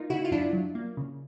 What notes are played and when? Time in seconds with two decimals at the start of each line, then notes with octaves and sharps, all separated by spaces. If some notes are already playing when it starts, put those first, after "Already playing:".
Already playing: A#3 D#4 F4
0.10 C#3 E4 F#4
0.25 F4
0.31 F#2 D4 E4
0.53 F#3
0.75 A#3
0.97 C#3